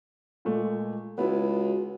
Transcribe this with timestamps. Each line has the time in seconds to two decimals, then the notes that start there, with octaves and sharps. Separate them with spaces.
0.45 A#2 G#3 A3
1.18 C#2 B3 E4 F#4